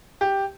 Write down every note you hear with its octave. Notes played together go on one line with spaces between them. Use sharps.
G4